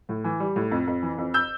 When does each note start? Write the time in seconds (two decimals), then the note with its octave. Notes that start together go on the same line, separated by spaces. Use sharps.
0.09 A2
0.24 E3
0.40 G3
0.56 A2
0.71 F2
0.87 F2
1.03 E3
1.18 F2
1.34 E6 G6